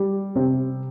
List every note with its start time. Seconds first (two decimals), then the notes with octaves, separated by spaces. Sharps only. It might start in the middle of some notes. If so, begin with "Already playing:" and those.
Already playing: G3
0.36 C3 C4